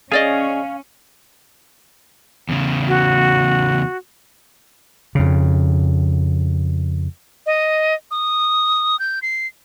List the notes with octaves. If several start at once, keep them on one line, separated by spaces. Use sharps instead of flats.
C#4 G#4 D5 D#5 F5 G#5
E2 C#3
F#4
F2 C#3
D#5
D#6
G6
C7